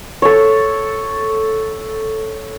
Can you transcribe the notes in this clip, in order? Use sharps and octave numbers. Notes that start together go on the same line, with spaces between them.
A4 C#5